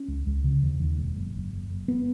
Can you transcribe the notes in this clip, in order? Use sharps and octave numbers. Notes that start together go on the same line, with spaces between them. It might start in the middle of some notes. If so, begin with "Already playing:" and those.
Already playing: C#4
C#2
C#2
C#3
D#2
D#2
E1
F#1
F#1
F#1
F#1
B3